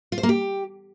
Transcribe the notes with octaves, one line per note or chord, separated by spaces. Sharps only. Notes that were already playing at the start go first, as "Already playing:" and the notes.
F4
C5
A#3
G4